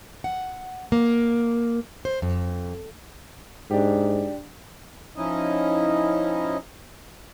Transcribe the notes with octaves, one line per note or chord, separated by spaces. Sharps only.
F#5
A#3
C5
F2
G#2 D4 G4
F3 C#4 D#4 E4 D#5